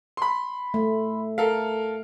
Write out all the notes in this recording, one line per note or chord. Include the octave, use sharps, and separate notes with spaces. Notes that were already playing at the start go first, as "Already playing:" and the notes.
B5 C6
A3
A4 A#4 F5